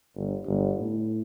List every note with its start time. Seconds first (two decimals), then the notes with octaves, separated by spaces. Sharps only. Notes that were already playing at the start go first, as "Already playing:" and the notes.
0.15 G1
0.46 G1
0.78 A2